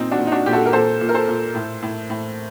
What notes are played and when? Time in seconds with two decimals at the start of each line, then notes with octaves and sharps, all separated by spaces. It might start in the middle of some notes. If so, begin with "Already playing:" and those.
Already playing: A#2 C4 D#4
0.11 D4 F#4
0.18 A#2
0.27 D#4
0.32 D4 F#4
0.46 A#2 G4
0.53 F#4 A4
0.66 A#4
0.73 A#2 A4 C5
1.01 A#2
1.09 A#4
1.14 A4 C5
1.28 A#2
1.55 A2
1.82 A2
2.10 A2